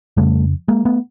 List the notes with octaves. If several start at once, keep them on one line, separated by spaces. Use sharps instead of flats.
F2 C#3 G3 A3
G#3 A#3
A3 B3